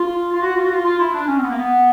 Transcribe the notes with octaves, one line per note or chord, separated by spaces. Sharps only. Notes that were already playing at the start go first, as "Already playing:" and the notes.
Already playing: F4
F4
F#4
F4
F#4
F4
F4
E4
D4
C#4
C4
B3
A#3
B3